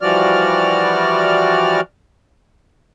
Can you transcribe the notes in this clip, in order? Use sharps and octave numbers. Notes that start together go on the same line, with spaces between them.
E3 F3 G3 F#4 D5 F6